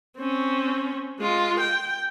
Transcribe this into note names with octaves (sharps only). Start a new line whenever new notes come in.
C4 C#4
G#3 F4
G5